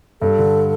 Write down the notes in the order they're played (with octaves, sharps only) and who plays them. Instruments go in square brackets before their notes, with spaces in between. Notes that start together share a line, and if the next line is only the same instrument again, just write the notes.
[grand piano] G2 [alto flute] A4
[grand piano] D3